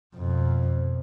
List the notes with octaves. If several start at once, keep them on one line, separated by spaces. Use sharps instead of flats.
F2 B2